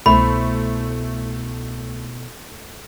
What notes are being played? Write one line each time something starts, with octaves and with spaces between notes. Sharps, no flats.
C2 B2 A3 E4 C5 B5